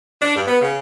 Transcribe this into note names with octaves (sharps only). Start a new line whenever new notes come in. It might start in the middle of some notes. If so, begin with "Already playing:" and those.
D4
G2
B3
C#3